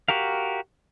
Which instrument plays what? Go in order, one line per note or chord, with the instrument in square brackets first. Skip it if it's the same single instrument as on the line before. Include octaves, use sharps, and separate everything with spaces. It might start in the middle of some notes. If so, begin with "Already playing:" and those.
[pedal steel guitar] F#4 G4 A#4 F5